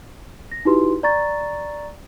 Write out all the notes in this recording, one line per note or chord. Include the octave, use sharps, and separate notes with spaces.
A#6
D#4 E4 F#4 G4 B4 C6
D5 A#5 C#6 A6